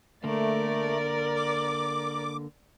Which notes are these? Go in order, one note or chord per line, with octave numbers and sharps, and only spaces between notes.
D3 A3 A#3 A#4 D5
D6